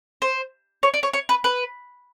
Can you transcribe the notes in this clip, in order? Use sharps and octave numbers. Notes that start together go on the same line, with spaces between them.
C5
C#5
D5
C#5
C#5
B4
B4